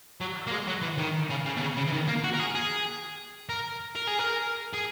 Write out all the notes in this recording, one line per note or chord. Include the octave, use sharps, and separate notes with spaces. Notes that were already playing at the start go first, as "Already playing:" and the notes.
F#3
A#3
G#3
F#3
E3
D#3
C#3
C#3
B2
C#3
C#3
E3
D#3
A#3
F#4
A#4
G#4
G#4
A#4
A#4
G#4
A#4
G#4